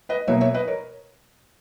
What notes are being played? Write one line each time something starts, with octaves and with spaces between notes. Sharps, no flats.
B4 D#5
B2 F#3 A#3 C#5 E5
C#5 E5
B4 D#5
A#4 C#5